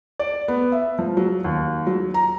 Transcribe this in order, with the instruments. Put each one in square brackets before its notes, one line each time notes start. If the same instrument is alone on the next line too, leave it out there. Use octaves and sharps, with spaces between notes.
[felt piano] D5
B3
E5
F3
F#3
D#2
F#3
A#5